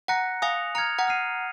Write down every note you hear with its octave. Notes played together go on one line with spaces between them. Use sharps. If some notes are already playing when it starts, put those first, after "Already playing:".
F#5 A#5 F#6 A#6 C#7
F5 G#5 D#6 A#6 F7
A#5 F6 G#6 C#7 F7
F#5 A#5
F6 C7 D#7